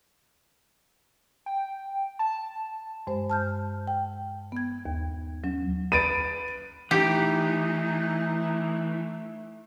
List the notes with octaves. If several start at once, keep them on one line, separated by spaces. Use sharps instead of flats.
G5
A5
G2 G#3 C5
A5 F6 G6
G5
B3 G#6
D#2
F#3 C#4
B4 A6 D7 D#7
E3 A3 D#4 G4